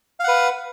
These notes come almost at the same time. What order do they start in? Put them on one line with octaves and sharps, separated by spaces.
F5 F#5 B4